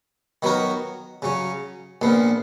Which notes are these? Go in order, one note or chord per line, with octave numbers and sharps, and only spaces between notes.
D#3 F#3 B3 F#4 A#4
C#3 F#3 C#4
A#1 A#2 F3 B3